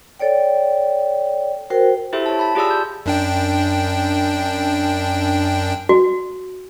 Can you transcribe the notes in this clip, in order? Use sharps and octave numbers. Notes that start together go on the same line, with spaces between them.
A4 C#5 D5 G5
F#4 A#4 C5 G5
E4 G4 A4 C5 E5
C#5 A5
A5 B5
F4 G4 G#4 D5 A5 E6
G6
F#2 D4 G5
F#4